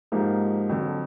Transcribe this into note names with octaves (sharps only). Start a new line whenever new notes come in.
G#2 F3 A#3 D#4 G4
F2 D3 F#3